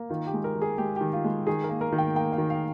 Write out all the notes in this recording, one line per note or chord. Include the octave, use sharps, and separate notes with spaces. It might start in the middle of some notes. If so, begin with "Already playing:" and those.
Already playing: A#3
D#3 F4
G4
G#3
A#4
D#3
G#4
G#3 G4
D#3 G4
F4
G#3
D#3 G#4
A#4
A#3
A#4
D#3
G5
A#3 G5
F5
D#3
F5